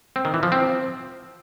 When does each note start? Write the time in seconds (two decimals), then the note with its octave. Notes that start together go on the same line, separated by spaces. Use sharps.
0.16 C4
0.25 D#3
0.34 E3
0.43 F3
0.52 C4